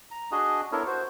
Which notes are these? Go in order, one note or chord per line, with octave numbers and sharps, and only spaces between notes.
A#5
D4 F#4 G#4 D#5
B3 D4 E4 A4 A#4 C#5
F#4 C5